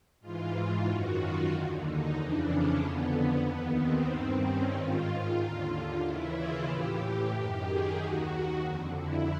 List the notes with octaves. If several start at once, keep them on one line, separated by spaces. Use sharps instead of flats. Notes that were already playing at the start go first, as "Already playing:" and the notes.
G#2 E3 F4
F#2 D#3 F#4
F4
D#2 D3
D#4
F2 C#3 E3 D4
C#4
F2 D3 B3
B3
D#2 D#3 B3
C4
G2 D#3
C#4
G#2 D#3 F4
D#2 D3 F4
F4
D#2 C#3 E3 E4
F4
A2 E3 G4
F#2 D#3
G#4
D#2 D#3 F#4
F2 D3
E4